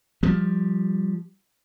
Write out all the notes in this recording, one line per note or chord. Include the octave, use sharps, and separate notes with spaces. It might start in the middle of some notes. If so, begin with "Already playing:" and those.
F3 G3